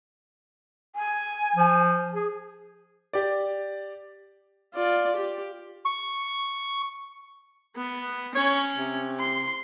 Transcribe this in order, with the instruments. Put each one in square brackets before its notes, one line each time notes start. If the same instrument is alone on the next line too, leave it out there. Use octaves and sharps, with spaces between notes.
[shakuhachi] G#5
[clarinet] F3
G#4
[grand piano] G4 D5
[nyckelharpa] F4 D5
G4
[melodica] C#6
[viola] B3
[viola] C#4 [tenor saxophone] C#5
[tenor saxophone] C3
[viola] C6